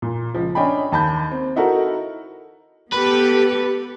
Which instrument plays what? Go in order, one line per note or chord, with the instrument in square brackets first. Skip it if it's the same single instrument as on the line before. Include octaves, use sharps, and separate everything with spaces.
[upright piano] A#2
C#2 F3
C#4 D4 D#5 G5 G#5 B5
D#2 A5 B5 G6
C4
D#4 E4 F#4 A4 A#4
[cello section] B3 G4 A4 [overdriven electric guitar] B4